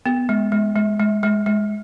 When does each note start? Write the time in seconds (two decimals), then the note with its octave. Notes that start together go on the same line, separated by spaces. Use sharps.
0.06 B3
0.29 G#3
0.52 G#3
0.76 G#3
1.00 G#3
1.23 G#3
1.46 G#3